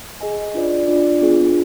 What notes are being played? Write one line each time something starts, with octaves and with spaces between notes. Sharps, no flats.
G#4 D#5 G#5
D4 F4 B4 D5
D4 F4 B4 D5
B3 D4 F4 G#4